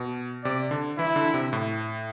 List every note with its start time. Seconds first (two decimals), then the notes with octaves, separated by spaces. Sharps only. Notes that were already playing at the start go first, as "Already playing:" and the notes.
Already playing: B2
0.44 C3 D5
0.71 D3
0.98 E3 E4
1.16 D3
1.34 C3
1.53 A2